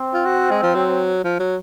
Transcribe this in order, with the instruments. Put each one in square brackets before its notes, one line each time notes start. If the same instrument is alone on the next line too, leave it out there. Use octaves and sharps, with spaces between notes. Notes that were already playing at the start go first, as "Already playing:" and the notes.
Already playing: [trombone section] C4
[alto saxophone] F4
F#4
G#3
F3
F#3
F3
F#3